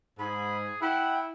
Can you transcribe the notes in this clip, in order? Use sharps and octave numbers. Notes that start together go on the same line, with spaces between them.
G#2 G#4 B5
E4 F#5 G5